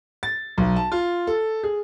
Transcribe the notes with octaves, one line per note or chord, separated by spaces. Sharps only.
A6
B1
A5
F4
A4
G#4